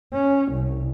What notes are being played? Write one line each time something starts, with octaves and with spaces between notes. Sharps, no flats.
C#4
C2